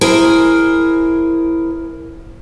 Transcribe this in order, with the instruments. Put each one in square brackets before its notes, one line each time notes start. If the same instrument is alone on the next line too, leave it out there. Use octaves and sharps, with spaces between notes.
[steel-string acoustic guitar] E4 G#4 A#4 C5 G#5